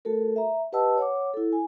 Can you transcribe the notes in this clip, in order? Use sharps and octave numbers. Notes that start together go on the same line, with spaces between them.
A3 F#4 A4 A#4
E5 A#5
G4 B4 D#5 F#5 A5 E6
C#5 F#5 D6
E4 A4
G#5